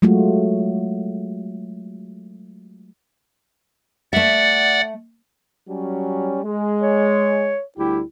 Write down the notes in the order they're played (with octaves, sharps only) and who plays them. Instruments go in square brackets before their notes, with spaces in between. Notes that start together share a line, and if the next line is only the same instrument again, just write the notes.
[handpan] F#3 G#3 A3 F4 F#4
[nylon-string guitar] A3 E5 [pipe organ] D5 F#5
[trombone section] F#3 G3 C#4
G#3
[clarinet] C#5
[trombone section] D2 G3 G4 [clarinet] E4